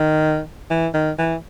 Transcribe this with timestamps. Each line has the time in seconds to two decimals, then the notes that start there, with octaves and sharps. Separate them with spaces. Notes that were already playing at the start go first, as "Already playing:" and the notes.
Already playing: D#3
0.71 E3
0.94 D#3
1.19 E3